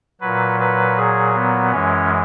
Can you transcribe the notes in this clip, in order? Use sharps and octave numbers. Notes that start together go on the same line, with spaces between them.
A#2 F#3 B4
B4
G#4
B3
F#2 E3 G#3 C#4